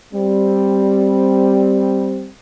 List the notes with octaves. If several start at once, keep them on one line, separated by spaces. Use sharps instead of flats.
G3 C4